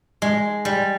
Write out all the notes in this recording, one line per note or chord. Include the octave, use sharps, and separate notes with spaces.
G#3
G3